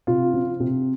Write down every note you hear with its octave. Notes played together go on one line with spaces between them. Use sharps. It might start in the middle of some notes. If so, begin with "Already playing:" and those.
C3 F4
F3
C3